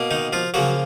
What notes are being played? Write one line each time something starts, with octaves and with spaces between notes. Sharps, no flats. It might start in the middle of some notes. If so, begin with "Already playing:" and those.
Already playing: B2 A#3
D#3 D#4
F3 F4
C#3 F3 F#3 A#3 F#4